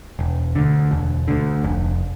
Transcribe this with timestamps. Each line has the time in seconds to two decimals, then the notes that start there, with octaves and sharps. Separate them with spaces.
0.19 E1
0.55 D2 D3
0.91 E1
1.28 D2 D3
1.64 F1